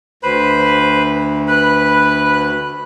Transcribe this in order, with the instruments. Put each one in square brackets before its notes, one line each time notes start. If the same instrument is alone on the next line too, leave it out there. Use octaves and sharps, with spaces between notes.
[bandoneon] D2 [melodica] B4 C5 B5
[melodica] B4 B5 [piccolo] F#6